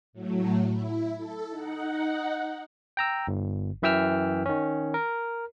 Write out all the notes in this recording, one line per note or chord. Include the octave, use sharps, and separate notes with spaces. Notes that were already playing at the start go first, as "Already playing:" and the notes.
A2 F#3 A3
E4
A4
D#4 F#5
G5 A#5 E6
G1
F#2 E3 E5 G5 E6 F6
D#3 C#4
A#4